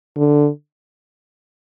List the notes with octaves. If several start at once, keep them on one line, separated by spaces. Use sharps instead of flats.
D3